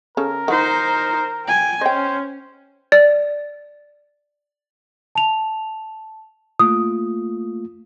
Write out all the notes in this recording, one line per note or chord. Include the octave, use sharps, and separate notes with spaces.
C#3 C#4 A4 A#4
D#3 D#4 C5 F#5
G5 G#5
C#4 C5 D#5 G5
D5
A5 F7
A3 A#3 F4 D#6